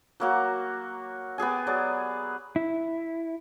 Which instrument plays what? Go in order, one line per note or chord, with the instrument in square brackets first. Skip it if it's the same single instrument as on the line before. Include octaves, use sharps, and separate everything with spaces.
[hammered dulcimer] F#3 A#3 F#4
B3 G4 G#4 G#5
F#3 G#4 D5
[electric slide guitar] E4